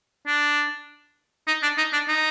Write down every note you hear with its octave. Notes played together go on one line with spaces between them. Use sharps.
D4
D#4
D4
D#4
D4
D#4